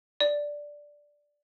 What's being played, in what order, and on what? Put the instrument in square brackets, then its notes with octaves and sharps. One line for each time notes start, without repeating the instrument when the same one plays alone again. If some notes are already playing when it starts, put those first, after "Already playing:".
[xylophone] D5